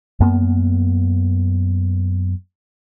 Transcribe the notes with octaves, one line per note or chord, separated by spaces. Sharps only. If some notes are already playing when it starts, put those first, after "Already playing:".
F#2 A#3 B3